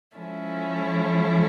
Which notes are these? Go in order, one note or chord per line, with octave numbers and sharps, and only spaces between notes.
F3 G#3 C#4 E4 A4